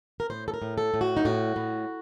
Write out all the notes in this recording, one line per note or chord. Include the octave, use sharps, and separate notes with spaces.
A#4
A2 C5
A4
A#4
A2
A4
A2
F#4
D#4
A2 F#4
A2